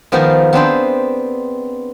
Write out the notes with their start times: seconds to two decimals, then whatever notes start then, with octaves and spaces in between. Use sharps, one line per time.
0.12 D#3 F3 B3 G#4 A#4
0.53 B3 C4 D4 C5